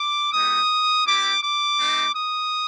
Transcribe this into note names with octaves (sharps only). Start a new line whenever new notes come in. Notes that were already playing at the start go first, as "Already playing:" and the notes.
Already playing: D6
G#3 B3 D#4 G4 D#6
C4 E4 G4 D6
D6
A3 C4 D#4
D#6